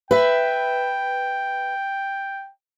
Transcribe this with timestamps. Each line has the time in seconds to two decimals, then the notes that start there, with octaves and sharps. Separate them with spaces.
0.11 B4 E5 G5